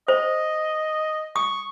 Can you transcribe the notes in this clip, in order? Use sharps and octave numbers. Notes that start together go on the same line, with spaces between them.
C5 D#5
C#6 D#6